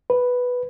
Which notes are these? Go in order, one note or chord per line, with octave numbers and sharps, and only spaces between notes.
B4